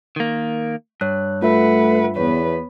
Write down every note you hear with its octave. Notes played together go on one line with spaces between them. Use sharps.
D#3 A#3
G2 C#5 F#6
A3 F4 B4 E5 F#5
E2 B3 B4 C#5